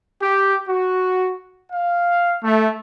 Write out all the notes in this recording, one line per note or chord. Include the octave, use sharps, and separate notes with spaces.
G4
F#4
F5
A3